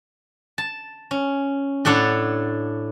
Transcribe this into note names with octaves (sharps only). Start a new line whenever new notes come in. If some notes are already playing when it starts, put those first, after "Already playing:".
A5
C#4
A2 D4 A4 C#5 F#5